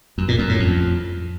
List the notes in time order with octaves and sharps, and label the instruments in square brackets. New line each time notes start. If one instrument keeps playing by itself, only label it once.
[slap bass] F#2
A#2
F#2
A2
F2